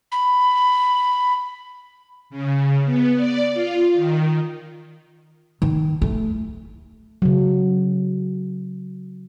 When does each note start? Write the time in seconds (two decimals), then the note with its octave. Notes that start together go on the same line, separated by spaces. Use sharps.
0.12 B5
2.30 C#3
2.85 B3
3.16 D5
3.54 F4
3.94 D#3
5.62 D#3
6.02 A3
7.22 C#3 F#3